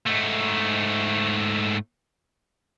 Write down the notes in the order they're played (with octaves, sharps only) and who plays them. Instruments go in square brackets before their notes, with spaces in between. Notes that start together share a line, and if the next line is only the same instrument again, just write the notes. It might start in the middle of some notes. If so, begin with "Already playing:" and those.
[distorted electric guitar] G#2 A3